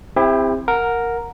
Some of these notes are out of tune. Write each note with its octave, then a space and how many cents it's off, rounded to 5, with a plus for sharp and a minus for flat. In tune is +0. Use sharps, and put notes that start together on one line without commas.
C4 +0 E4 +0 G4 +40
A#4 +0 F#5 -20